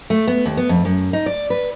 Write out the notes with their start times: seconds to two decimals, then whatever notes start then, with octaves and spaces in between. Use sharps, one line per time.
0.10 A3
0.27 B3
0.45 D#2
0.57 B3
0.69 F2
0.85 F#2
1.13 D#4
1.26 D5
1.50 B4